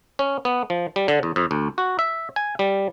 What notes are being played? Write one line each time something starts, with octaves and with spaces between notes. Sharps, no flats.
C#4
B3
F3
G3
D3
E2
F2
D2
F#4
E5
G#5
G3